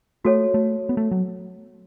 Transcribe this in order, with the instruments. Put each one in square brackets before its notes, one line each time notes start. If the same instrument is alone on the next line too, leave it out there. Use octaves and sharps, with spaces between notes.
[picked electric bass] A3 [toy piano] F#4 A4 C#5
[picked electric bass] A3
B3
A3
F#3